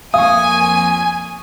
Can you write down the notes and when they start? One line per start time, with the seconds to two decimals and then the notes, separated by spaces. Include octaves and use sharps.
0.14 F2 A#3 F5 G#5 C#6 D#6